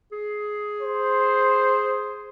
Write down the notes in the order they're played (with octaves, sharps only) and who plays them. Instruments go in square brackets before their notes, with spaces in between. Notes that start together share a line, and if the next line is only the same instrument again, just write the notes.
[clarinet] G#4
[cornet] C5